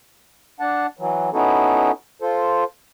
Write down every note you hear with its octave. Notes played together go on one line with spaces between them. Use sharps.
D4 F#5 A5
E3 F#3
B3 C#4 D#4 E4 F#4 A4
F4 A4 C5